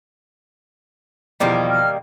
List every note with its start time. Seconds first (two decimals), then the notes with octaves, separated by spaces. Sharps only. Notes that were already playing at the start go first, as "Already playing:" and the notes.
1.40 E2 B2 D#3 F3 G3 A#3
1.70 F6